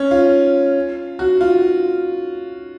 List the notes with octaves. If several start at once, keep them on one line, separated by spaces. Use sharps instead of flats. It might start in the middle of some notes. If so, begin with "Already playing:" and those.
Already playing: C#4
F4
F#4
F4